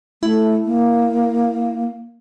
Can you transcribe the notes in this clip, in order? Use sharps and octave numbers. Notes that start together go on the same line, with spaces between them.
A3 E4
A#3